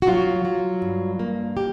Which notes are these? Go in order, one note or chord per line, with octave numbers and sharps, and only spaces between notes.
F#4
F#3 F4
F#3
G2
A#3
G4